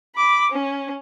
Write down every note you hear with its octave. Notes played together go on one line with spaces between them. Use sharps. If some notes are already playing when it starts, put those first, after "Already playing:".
B5 D6
C#4